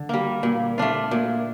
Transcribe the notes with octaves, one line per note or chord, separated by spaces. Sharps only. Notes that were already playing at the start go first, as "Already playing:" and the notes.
Already playing: D3
G3 A#3
A#2
A3 D4 F4
A#2